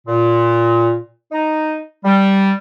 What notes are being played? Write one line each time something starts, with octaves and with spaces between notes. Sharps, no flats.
A#2
D#4
G3